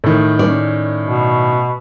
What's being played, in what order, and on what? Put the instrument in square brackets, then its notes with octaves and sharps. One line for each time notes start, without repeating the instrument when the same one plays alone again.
[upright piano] A2 D#3
[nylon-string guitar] C#4 D5
[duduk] B2